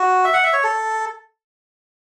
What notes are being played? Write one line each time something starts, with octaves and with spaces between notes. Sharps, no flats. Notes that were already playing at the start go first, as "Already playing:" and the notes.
Already playing: F#4
E5
F#5
E5
C#5
A4